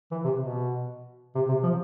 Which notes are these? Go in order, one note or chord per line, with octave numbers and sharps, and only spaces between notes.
E3
C3
B2
C3
C3
F3